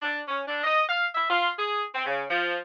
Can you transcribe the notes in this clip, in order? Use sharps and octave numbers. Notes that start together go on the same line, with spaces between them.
D4
C#4
D4
D#5
F5
E5
F4
G#4
C4
C#3
F3